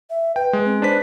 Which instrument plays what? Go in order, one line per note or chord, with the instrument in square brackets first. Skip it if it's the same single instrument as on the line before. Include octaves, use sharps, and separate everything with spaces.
[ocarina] E5
[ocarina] B4 [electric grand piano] G5
[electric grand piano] G#3
[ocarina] C4
[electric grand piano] D4 B4 B6 [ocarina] C5